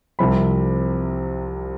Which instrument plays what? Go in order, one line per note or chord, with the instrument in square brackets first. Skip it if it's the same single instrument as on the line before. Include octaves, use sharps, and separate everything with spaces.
[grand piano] C2 C3 F3 B5